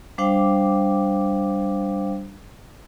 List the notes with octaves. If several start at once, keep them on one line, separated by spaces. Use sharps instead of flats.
G3 D4 C5 F5 G5 D6